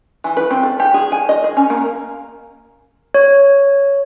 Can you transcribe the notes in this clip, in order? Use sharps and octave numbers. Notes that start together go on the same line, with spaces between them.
E3
B4
C4
A4
G4
G#4
G#5
D#5
G#4
C#4
A#3
C#5